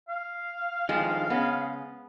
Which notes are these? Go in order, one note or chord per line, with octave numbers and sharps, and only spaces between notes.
F5
D3 D#3 F3 G#3 C5
C#3 B3 C#4